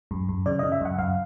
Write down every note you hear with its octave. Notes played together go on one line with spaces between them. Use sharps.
F#2
F#2
C#3 D5
C#3 D#5
E5
F#2 F#5
F#2 F5